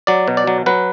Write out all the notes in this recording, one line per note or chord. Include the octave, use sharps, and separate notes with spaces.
F#3 D5
B2
D5
F#3
F#3 B4